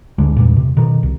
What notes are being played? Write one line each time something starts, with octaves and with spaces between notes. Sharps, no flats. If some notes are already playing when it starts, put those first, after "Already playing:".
G1 D2 G#3 D4
E2 G2 A#2
C3
B2 D#3
C2